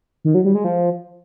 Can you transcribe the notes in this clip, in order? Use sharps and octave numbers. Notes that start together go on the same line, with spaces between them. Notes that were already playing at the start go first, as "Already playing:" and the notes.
D#3
F#3
G3
G#3
F3